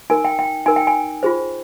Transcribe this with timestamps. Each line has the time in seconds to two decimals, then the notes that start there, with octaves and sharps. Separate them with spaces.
0.10 D#4 A#4 G#5
0.25 G5
0.39 G5
0.66 D#4 A#4 G#5
0.76 G5
0.87 G#5
1.23 F4 G#4 C5